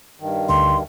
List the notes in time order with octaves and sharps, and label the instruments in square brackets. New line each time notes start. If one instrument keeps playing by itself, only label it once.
[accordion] G2 D#3
[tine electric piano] D2 D3 [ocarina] C6